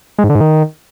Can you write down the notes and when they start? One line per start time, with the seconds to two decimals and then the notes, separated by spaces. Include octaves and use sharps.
0.18 G#3
0.24 G#2
0.30 D3
0.35 G#2
0.41 D#3